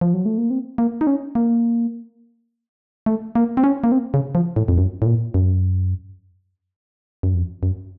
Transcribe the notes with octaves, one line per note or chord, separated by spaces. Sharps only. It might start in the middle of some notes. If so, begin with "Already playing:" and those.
F3
F#3
A3
A#3
C4
A#3
D#4
C#4
A#3
A3
A#3
C4
C#4
A#3
C4
C#3
F3
A2
F2
F#2
A2
A#2
F#2
F#2
F2
F#2